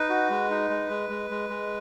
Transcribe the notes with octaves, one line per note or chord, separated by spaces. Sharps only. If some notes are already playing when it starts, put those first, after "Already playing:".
Already playing: D#4 B4
F#4
G#3
D#4
G#3
G#3
G#3
G#3
G#3